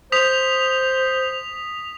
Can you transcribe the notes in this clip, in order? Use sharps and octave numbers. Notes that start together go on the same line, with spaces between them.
C5 D#6 B6 F7